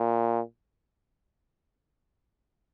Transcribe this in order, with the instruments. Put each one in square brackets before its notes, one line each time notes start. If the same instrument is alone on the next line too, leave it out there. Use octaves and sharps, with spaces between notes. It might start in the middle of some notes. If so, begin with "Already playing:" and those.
Already playing: [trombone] A#2